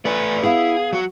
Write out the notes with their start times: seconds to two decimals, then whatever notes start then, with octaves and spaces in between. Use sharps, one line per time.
0.05 A3 B4 D5 G#5
0.44 B3 E4 G#4 F5
0.93 F#3 F#4